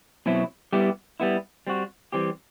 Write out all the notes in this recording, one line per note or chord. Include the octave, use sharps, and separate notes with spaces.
B2 F#3 C4 E4
G3 B3 E4 G4
G3 B3 E4
G3 C4 F#4
E3 G3 C4 G4